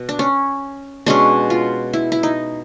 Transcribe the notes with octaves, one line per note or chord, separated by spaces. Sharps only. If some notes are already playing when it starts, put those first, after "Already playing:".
Already playing: B2
D4
C#4
B2 G#3 C#4 D4
F4
E4
E4
D#4